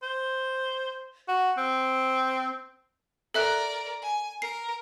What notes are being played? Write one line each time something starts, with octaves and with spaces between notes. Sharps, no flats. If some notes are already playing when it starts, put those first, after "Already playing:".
C5
F#4
C4
A4 A#4 D5 E5 F#6
G#5
A#4 C7